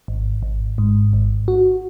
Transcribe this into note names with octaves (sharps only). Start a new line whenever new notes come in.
G#1
G#1
G#2
G#1
F#4